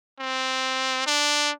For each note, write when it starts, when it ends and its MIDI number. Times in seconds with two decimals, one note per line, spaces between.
0.20 1.06 60
1.07 1.51 62